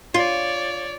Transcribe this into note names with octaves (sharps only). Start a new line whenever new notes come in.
F4 C#5 D5